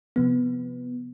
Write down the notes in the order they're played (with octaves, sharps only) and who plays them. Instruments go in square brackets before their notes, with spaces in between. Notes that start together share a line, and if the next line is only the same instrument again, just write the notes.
[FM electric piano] C3 F3 B3